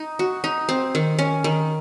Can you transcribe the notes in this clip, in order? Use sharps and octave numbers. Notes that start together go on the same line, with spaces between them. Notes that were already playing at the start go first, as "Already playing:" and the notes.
Already playing: D#4
F#4
D#4
C4
D#3
C#4
D#3